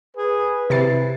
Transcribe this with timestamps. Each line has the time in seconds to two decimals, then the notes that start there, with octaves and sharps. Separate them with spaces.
0.17 G#4 B4
0.70 C3 E4 A6 C7